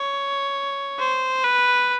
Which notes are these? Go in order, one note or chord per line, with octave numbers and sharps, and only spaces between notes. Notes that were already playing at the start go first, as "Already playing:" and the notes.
Already playing: C#5
C5
B4